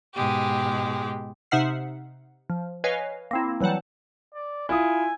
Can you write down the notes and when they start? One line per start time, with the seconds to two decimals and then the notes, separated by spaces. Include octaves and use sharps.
0.14 G#2 B2 G#3 G4
1.51 C3 D#4 E5 F#5 F6 C7
2.50 F3
2.84 B4 C#5 D#5 F5 G#5
3.31 A#3 C4 E4
3.60 E3 F#3 G3 F#5 A5
4.34 D5
4.69 E4 F4 G#5 D#6